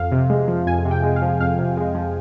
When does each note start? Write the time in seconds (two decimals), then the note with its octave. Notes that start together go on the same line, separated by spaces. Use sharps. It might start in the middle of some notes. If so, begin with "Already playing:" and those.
Already playing: F2 F5
0.12 C3
0.30 G#3
0.48 F3
0.66 F2 G#5
0.85 C3
0.91 G5
1.03 G#3
1.16 F5
1.22 F3
1.41 F2 F5
1.59 C3
1.77 G#3
1.95 F3